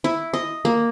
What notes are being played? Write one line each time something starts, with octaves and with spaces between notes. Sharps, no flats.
E4
D#5
A#3